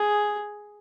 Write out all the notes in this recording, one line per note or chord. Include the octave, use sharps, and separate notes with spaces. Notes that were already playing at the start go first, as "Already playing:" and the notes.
Already playing: G#4